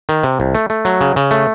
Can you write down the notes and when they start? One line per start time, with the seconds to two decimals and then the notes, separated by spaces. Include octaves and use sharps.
0.09 D#3
0.23 C3
0.40 C2
0.55 A3
0.70 A3
0.85 F#3
1.01 C#3
1.16 C#3
1.31 A3